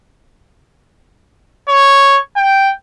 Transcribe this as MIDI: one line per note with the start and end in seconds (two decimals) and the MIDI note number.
1.69 2.18 73
2.37 2.71 79